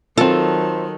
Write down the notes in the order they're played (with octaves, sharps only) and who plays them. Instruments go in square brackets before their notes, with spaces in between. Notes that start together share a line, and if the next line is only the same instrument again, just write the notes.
[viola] D#3 F#3 [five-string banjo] C4 F4 [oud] A4